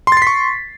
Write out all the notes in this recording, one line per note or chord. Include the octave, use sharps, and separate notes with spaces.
C6 C#6 A6 B6 C7